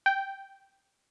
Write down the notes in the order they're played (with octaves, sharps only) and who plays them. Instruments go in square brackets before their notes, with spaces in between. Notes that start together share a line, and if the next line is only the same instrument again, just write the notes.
[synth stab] G5